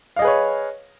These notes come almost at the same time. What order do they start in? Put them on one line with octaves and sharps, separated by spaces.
F5 D#5 G#4 B4 C#5